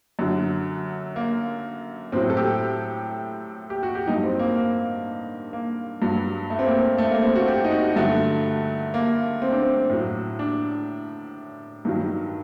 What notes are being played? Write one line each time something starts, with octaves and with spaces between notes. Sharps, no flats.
F#2 D3 F#3
A#3
A2 F#3 C4
A4
G4
G4
F#4
G4
G2 F#3 D#4
C4
A#3
A#3
A#3
G2 F#3
A3
C4
A#3
A3
A#3
C4
F#4
G4
D#4
F#4
G2 D3 F#3 A3
A#3
C4
D4
C4
A2 F#3
D4
G2 D#3 F#3